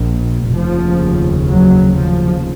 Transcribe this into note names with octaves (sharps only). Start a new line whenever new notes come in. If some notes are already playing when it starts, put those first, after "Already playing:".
Already playing: A#1 A#2
F1 D#2 C#3 F3
F#3
F3